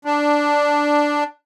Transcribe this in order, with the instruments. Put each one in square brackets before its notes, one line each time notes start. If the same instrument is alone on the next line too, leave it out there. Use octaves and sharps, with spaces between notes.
[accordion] D4